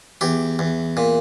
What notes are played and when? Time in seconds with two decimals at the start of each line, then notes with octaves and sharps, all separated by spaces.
0.21 E2 G4
0.59 E2
0.97 A#2